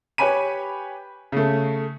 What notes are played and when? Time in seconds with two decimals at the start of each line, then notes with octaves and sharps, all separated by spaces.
0.18 G4 B4 C#5 G#5 B5 D#7
1.32 C#3 A3